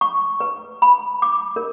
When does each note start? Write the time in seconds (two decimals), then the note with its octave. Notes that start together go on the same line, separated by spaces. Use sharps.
0.01 C#6
0.40 B4
0.82 B5
1.22 D6
1.56 A#4